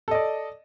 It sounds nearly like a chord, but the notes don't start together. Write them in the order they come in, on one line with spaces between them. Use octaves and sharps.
A4 D#5 D5